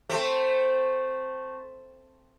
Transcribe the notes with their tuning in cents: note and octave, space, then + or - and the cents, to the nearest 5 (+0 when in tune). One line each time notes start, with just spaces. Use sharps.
A3 +0 C4 +0